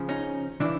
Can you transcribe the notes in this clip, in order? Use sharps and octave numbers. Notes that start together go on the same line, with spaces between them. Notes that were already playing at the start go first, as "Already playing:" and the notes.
Already playing: C#3 F3
C#4 D#4
C#3 E3 D4 E4